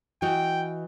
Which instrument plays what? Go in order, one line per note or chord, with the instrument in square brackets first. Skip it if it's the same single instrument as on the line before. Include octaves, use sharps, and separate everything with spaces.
[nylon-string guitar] E3 F#4 D#5 [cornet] G5